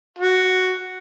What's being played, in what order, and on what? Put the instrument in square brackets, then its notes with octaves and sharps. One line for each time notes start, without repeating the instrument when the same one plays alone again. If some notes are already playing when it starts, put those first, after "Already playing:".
[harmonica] F#4